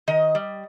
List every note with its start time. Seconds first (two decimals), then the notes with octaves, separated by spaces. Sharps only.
0.08 D#3 D#5
0.35 G3